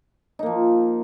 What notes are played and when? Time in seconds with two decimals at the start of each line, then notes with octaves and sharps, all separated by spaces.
0.39 D#4
0.43 A#3
0.46 F3